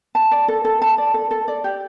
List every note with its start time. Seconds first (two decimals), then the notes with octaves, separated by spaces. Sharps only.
0.15 A5
0.31 D5
0.48 A4
0.65 A4
0.82 A5
0.98 D5
1.14 A4
1.31 A4
1.48 D5
1.64 G4